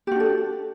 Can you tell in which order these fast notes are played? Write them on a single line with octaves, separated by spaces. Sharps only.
G4 F#4 D4 A4